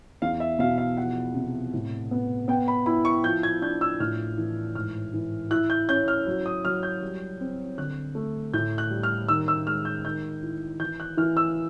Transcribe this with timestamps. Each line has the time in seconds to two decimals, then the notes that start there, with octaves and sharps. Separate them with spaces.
0.22 E2 F5
0.40 E5
0.59 B2 F5
0.78 F5
0.97 F3 F#5
1.34 C3
1.73 A2
2.11 B3
2.48 B3 G5
2.68 B5
2.86 E4 B5
3.05 C#6
3.24 F3 G6
3.43 G#6
3.62 D4 G6
3.81 E6
4.00 A2 F6
4.38 E3
4.75 G#2 F6
5.14 E3
5.51 E4 F#6
5.70 G6
5.89 C#4 G6
6.08 F6
6.27 F#3
6.46 D#6
6.64 F#3 F6
6.83 G6
7.02 G3
7.40 C4
7.78 D3 F#6
8.15 A3
8.54 A2 G6
8.78 F#6
8.91 G3
9.03 F6
9.28 D#3 E6
9.48 E6
9.67 G#3 F6
9.85 G6
10.05 D#3 G6
10.42 E4
10.80 E3 G6
11.00 F#6
11.17 E3 F6
11.37 E6